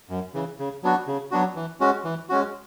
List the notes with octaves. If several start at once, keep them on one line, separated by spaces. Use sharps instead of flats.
F#2
C#3 E3
C#3
F#3 B3 D4 F#4
C#3
F#3 B3 D4 F#4
E3
G#3 C#4 F#4
E3
G#3 C#4 F#4